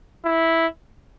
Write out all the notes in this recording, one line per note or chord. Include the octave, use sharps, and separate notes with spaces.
E4